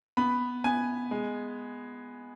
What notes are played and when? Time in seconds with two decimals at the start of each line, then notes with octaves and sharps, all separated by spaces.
0.17 B3 B5
0.64 B3 G#5
1.11 G#3